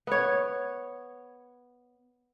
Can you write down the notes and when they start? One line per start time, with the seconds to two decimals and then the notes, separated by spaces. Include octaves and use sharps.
0.07 B3 C#5